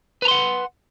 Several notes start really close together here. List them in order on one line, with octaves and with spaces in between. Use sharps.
B4 A#5 C6 F#5